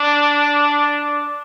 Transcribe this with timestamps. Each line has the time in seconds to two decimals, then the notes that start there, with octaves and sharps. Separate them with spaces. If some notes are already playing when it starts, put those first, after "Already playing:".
Already playing: D4